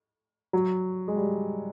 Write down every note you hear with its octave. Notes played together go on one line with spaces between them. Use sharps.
F#3
G#3
G3